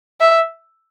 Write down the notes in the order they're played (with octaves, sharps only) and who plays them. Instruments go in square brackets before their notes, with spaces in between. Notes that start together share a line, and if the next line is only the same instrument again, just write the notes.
[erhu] E5